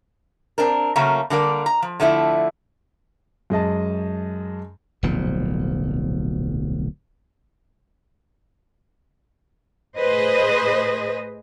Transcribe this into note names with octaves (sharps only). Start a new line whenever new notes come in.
C4 D4 A#4
C#3 F#3 A3 A#3 C#4
D3 G3 A#3 D5
A#5
F3
D3 F3 A3 E4
F#2 G#3 D#5 A5
D1 B1 A#2 F3
A2 G#4 B4 C5 D#5